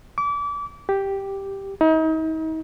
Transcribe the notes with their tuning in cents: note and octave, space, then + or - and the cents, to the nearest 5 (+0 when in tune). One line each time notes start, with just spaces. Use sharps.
D6 -30
G4 +0
D#4 +40